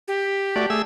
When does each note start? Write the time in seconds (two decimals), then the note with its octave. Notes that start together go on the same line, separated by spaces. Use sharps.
0.08 G4
0.56 A3 F#4 D5
0.70 A3 G#4 E6